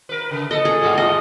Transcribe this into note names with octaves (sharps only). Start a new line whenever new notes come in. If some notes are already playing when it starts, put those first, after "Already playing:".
A#4 B4
C#3
A4 D#5
G#4
E2 G#2 F4
D#5